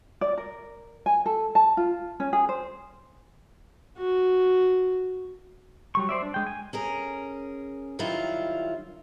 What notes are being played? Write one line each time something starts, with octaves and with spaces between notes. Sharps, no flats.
D5
A#4
G#5
A4
A5
F4
C#4
G#4
C5
F#4
F#3 G3 C#6
C5 D5 E5
D4
G#3 G5
G#5
C#4 G#4 A#4
D#3 F#3 G3 E4 F4